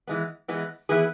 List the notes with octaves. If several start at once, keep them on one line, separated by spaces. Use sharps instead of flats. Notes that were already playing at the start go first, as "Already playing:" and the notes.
E3 G#3 B3
E3 G#3 B3
E3 B3 E4 G#4 B4